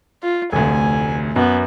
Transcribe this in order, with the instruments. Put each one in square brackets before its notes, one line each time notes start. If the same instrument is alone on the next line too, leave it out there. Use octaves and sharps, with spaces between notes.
[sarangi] F4
[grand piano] F1 D2 [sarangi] G#5
[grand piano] F#2 [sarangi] B3